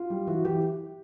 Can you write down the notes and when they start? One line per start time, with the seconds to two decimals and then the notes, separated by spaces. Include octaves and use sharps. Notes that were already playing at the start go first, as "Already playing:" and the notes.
Already playing: F4
0.10 G3
0.27 E3 F#4
0.45 E3 G4